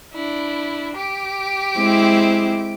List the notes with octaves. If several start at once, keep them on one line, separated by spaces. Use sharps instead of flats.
D4 E4
G4 D6
G#3 C4 E4